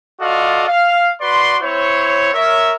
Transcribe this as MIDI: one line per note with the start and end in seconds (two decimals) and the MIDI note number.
0.21 0.63 65
0.21 0.63 66
0.21 0.63 69
0.21 0.63 74
0.21 0.63 75
0.21 0.63 77
0.68 1.12 77
1.21 1.57 66
1.21 1.57 71
1.21 1.57 74
1.21 1.57 84
1.62 2.31 60
1.62 2.31 64
1.62 2.31 72
1.62 2.31 73
2.34 2.73 70
2.34 2.73 73
2.34 2.73 76